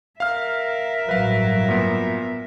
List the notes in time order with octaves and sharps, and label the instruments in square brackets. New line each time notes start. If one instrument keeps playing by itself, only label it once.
[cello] A#4 E5 [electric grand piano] F5 F6
[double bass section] A1 G2 F#3 [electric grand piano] B4 F5
[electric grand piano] A#2 B3